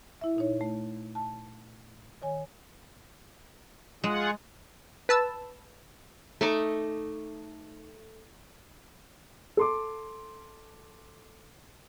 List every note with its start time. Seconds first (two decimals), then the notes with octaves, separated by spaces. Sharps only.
0.21 E4 E5
0.36 A#2 D#4 C#5
0.61 A3
1.15 A5
2.22 D#3 C#5 G#5
4.04 G#3 F4 G#4 F#5
5.09 B4 A5 E6
6.41 A3 D#4 D6
9.57 A4 C6 D6